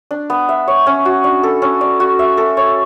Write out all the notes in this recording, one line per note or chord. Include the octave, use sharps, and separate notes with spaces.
D4
B3
E5
C#5
C#4
F#4
D4
A4
C#4
D5
F#4
E5
A4
C#5